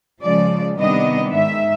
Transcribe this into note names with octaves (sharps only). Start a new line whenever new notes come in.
C#3 F3 G#3 D5
C3 D#3 G3 B3 D4 D#5
G#2 D#3 G#3 E5